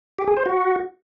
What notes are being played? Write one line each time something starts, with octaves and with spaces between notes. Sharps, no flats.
G4
G#4
C5
F#4